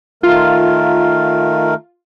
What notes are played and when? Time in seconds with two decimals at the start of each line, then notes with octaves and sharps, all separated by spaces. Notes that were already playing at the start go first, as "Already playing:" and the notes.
0.23 D#3 A3 F4 A#4